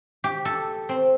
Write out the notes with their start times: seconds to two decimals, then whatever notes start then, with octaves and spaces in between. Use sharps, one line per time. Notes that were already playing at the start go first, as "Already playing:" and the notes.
0.24 G4
0.45 A4
0.89 C4